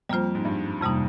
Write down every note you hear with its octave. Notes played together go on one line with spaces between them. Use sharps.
F2 G3 A#3 F4 C5
G#2
G2
F2 C3 G3 A#3 D#4